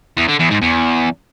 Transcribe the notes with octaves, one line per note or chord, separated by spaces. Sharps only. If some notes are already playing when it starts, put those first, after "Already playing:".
E2
D3
E2
G#2
E2